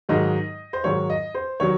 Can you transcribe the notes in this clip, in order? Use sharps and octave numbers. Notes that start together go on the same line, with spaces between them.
G#2 D#3 F#3 D#5
C5
G#2 D#3 F#3 C#5
D#5
C5
D#3 F#3 C#5